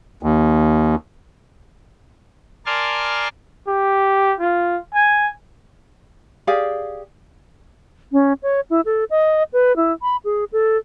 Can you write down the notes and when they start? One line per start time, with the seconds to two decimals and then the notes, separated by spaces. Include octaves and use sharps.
0.23 D#2
2.66 A#4 D5 G#5 A5 C6 F6
3.67 G4
4.40 F4
4.95 G#5
6.47 G4 G#4 D5 F5
8.12 C#4
8.43 C#5
8.70 E4
8.85 A4
9.10 D#5
9.53 B4
9.76 E4
10.02 B5
10.25 G#4
10.53 A4